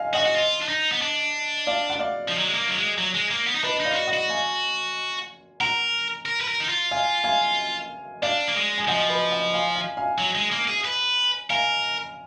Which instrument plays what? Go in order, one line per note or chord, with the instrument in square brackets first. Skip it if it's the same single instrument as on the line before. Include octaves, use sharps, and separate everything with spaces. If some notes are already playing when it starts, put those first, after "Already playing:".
Already playing: [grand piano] D#5 F5 G#5
[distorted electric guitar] F#4 [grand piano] D#5 F#5
[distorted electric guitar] F#4
F4
D4
D#4
B3
D4
[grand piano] D5 F5
F#5
D5 F5
[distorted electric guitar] F3
F#3
G#3
A#3
F#3
G#3
F#3
G#3
A#3
B3
D#4
[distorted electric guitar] D4 [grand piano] B4 D#5
[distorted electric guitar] D#4
[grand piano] D5 F5
[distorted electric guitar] F4
F#4
[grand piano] D#5 F#5
[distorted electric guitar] F#4
[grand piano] F5 G#5
[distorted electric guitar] A#4 [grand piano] F#5 A#5
[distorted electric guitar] A#4
B4
A#4
D#4
F4
[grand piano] F5 G#5
F5 G#5
[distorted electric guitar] D4 [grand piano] D5 F5
[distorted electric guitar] A#3
G#3
[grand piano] G#5
[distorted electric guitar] F3 [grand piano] D#5 F#5
[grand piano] B4 D#5
D#5 F#5
F5 G#5
F5 G#5
F5 G#5
[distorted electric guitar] F#3
G#3
A#3
G#4
B4
[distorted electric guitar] A#4 [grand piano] F5 G#5